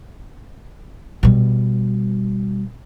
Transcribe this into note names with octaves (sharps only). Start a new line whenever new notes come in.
B2 G3